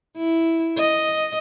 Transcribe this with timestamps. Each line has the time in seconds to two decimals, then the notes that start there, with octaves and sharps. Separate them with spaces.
0.17 E4
0.77 D#5